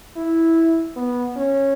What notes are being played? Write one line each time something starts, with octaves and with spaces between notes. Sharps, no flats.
E4
B3
C#4